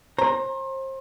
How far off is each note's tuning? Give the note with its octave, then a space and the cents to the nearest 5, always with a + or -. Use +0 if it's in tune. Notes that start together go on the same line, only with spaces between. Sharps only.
C5 +35 A#5 +0